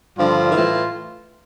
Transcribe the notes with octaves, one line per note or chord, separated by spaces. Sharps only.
G2 D3 F3 F4
A2 E3